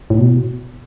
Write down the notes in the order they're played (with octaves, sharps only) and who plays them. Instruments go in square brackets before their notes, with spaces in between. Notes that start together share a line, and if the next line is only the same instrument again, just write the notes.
[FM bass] A2
B2